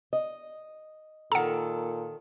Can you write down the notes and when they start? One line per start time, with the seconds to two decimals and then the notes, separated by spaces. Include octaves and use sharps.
0.13 D#5
1.32 A#2 D#3 A4 F#5 A#5